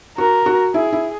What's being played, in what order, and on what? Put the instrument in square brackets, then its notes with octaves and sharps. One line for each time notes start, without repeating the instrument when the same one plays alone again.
[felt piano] F#4 [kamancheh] A#4
[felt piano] F#4
[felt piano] E4 [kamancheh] G#4
[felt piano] E4